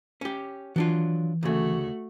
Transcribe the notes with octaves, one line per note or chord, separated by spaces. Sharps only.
C#4 G4
E3 F#3 D4 F4
D2 C#3 A3 F#4